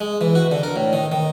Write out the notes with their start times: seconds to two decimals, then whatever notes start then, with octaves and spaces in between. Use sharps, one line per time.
0.01 G#3
0.21 E3
0.35 F#4
0.51 D3
0.63 A#4
0.76 A2
0.93 D#3
1.12 D#3